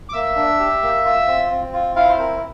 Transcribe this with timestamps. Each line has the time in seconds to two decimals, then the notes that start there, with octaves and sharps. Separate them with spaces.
0.09 D6
0.13 A#3 E5 E6
0.36 D4
0.59 G4
0.82 A#3
1.05 F4
1.27 C4
1.51 C4
1.73 F4
1.95 E4 F4 F5
2.09 C5
2.19 C4 A#4